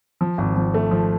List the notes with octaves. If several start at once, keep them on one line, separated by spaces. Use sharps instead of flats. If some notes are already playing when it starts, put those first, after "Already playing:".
F3
G#1
F3
A3
F3